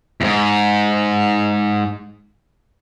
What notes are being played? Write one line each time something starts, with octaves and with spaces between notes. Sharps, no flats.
E2 G#2